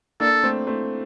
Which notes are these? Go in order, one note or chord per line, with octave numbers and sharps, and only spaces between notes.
A#3 D4 A4
A3 C4
A3 C4